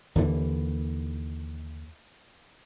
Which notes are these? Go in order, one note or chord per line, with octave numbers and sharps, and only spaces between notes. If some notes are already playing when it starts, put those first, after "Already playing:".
D#2 D3 E3